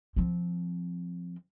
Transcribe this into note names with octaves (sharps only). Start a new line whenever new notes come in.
F3 C4